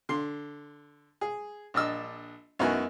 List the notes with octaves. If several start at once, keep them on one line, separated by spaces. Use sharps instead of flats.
D3 C6
G#4
A#1 D4 D#5 E6
F#2 B3 D#4 E4 F#4 G#5